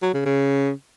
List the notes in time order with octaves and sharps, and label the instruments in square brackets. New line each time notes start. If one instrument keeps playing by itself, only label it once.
[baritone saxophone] F#3
C#3
C#3